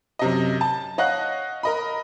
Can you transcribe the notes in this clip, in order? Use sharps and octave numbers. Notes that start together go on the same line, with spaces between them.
F#2 C3 D#5
A5
C#5 D#5 F5 F#5 F#6
A#4 D#5 B5